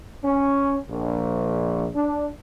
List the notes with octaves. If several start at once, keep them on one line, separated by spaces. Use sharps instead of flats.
C#4
A#1
D4